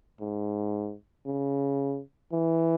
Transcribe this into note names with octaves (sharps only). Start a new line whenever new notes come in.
G#2
C#3
E3